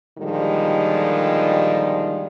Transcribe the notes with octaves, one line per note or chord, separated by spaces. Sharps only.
A#2 D3 D#3 F3 G3 G#3